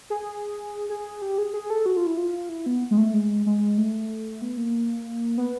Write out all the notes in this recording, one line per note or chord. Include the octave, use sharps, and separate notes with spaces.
G#4
G#4
G4
G#4
G#4
A4
F#4
F4
E4
F4
E4
B3
G#3
A3
G#3
G#3
A3
B3
A#3
B3